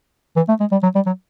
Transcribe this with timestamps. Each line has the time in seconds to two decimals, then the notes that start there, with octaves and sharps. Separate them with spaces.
0.36 E3
0.48 A3
0.60 G#3
0.72 G3
0.83 F#3
0.95 G3
1.06 F#3